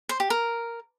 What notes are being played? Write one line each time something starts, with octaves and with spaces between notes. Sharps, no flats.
C5
G4
A#4